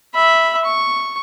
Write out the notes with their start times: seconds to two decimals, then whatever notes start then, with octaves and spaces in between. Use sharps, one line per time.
0.14 E5 B5
0.65 C#6